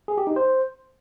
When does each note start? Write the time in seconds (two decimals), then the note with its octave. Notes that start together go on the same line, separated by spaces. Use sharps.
0.08 G#4
0.18 G4
0.27 D#4
0.36 C5